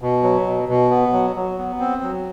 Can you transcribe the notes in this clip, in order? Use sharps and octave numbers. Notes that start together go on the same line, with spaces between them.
B2
F#3
B2
B2
B3
F#3
F#3
B3
C4
F#3